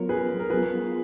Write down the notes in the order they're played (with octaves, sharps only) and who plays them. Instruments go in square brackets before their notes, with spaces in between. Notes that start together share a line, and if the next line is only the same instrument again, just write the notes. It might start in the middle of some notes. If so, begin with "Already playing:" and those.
Already playing: [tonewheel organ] F#3 B3 F4 [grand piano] A#4 C#5
[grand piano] G#4 B4
A#4
[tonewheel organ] F#3 B3 F4 [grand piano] G#4 B4